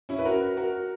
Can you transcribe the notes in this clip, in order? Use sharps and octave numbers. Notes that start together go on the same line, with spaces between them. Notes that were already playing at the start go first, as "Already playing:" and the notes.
C#4 E4
B4
F#4 A#4
F#4 A#4